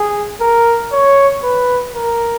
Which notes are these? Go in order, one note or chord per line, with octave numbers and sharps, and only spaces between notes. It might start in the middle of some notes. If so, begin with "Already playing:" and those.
Already playing: G#4
A#4
C#5
B4
A#4